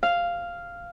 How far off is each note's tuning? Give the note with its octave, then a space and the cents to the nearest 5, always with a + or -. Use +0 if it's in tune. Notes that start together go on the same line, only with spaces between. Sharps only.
F5 -5